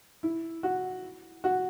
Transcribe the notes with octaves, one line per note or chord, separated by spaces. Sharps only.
E4
F#4
F#4